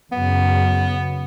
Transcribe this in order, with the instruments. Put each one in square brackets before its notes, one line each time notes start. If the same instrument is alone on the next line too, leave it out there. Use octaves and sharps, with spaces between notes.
[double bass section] F#2 C#3 [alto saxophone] B3